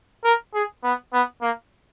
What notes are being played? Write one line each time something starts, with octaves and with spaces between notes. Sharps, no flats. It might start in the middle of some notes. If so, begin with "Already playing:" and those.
A#4
G#4
B3
B3
A#3